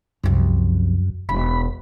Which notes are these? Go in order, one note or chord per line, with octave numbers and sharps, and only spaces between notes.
C2 F#2 F3
E1 B5